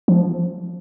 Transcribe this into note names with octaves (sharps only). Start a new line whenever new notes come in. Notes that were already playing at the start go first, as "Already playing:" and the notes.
F3